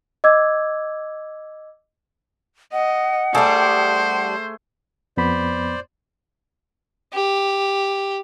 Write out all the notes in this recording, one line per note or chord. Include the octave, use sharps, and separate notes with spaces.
D#5 D6 E6 G#6
D#5 F#5
G3 A3 D4 G#4 C5
F2 B3 C5 D5 B5
G4